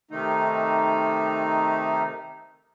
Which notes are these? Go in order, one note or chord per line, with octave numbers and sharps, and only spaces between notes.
C3 D#3 A3 D#4